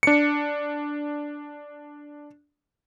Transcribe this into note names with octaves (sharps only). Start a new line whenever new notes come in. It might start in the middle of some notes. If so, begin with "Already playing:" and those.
D4 C#7